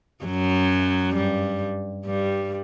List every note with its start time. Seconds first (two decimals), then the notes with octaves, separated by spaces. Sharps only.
0.25 F#2 F#3
1.16 G2 G3
2.05 G2 G3